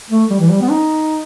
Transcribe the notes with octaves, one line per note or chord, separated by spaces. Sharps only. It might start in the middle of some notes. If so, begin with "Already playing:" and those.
A3
G3
E3
G3
B3
D#4